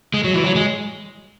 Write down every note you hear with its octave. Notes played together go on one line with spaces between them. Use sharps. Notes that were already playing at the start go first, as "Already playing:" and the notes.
G#3
F#3
E3
F#3
G#3